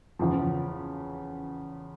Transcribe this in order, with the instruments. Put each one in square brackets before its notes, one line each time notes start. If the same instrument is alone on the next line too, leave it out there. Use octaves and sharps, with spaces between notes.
[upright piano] E2 C#3 F3